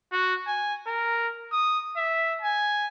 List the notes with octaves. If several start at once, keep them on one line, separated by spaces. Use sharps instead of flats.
F#4
G#5
A#4
D#6
E5
G#5